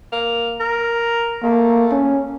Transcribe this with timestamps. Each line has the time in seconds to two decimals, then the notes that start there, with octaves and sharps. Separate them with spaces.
0.12 A#3
0.60 A#4
1.43 A3 A#3
1.91 C#4